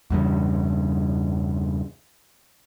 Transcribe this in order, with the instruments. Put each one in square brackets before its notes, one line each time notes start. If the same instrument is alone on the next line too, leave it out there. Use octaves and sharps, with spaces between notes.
[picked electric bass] E2 G2 C#3